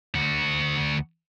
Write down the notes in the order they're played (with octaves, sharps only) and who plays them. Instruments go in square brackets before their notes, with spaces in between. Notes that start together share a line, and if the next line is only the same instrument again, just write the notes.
[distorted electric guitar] D2 F#4